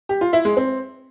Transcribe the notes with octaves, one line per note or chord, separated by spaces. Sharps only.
G4
F4
E4
G#3
C4